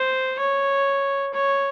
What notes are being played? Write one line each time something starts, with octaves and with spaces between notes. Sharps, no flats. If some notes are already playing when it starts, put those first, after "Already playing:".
Already playing: C5
C#5
C#5